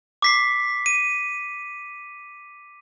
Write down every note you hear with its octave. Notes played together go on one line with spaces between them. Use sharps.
D6 B6 C7
D#7